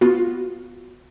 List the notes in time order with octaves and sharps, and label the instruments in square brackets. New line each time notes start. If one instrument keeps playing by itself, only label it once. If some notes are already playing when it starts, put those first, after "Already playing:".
[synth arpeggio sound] B3 F4 F#4